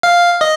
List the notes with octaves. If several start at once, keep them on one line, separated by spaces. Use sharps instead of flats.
F5
D#5